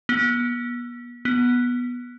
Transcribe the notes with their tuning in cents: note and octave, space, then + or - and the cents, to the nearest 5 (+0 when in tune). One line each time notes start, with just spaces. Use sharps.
B3 -35
B3 -10